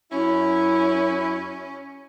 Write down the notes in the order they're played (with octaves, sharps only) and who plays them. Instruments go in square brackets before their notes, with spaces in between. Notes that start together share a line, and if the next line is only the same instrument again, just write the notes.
[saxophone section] F#2 E4 [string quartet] C#4